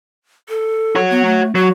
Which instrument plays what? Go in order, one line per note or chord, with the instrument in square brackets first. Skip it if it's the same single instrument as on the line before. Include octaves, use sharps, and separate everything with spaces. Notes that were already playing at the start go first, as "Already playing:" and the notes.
[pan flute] A4
[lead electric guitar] F#4 C#5
[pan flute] B3
A3
[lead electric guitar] F#3 [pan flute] F#4